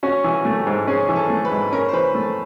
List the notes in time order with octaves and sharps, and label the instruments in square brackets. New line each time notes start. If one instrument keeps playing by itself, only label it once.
[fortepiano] C#4 [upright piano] F#4
[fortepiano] E3
[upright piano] F#4
[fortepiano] A3
[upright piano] G4
[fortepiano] G#2
[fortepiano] C#4 [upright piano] G#4
[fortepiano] E3
[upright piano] A4
[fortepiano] A3
[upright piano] B4
[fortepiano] G#2
[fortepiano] C#4 [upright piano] A#4
[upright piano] C5
[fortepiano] E3 [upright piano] B4
[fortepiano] A3